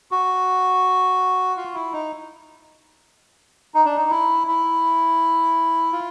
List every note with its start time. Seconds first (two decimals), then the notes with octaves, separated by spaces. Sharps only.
0.11 F#4
1.57 F4
1.74 E4
1.93 D#4
3.74 D#4
3.86 D4
3.96 D#4
4.10 E4
4.47 E4
5.92 F4